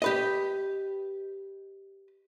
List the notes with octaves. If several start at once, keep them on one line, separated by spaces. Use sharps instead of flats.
G4 B4 D#5